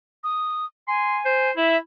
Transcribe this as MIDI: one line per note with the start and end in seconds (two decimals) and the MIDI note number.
0.24 0.65 87
0.88 1.51 80
0.88 1.18 84
1.25 1.51 72
1.57 1.77 64
1.57 1.77 76